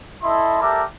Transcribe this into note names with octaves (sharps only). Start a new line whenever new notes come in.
E4 A4 D#5 C6
G4 A4 A#4 D5 E5